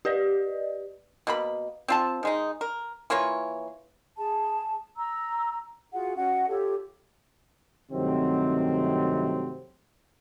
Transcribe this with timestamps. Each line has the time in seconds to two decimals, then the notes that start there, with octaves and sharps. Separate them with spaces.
0.05 G4 B4 D5 D#5
1.27 B2 A#3 B5
1.88 C4 F4 A5
2.23 D#3 G#3 D#4
2.61 A#4
3.10 E3 A#3 F4 C#5
4.18 G#4 A5
4.97 A#5 E6
5.92 F4 F#4 G#4 F#5
6.16 C#4 F#4 D#5 F#5
6.48 F4 G4 A4 C#5
7.92 G2 C3 D#3 F#3 A3 C4